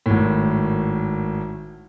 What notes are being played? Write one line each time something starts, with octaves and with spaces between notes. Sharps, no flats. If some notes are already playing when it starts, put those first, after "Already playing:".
G#1 A2